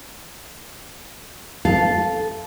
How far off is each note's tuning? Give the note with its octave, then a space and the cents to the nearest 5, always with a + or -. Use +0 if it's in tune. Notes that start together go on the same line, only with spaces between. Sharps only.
A4 -10 F5 +0